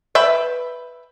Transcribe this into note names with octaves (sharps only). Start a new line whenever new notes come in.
B4 E5 G5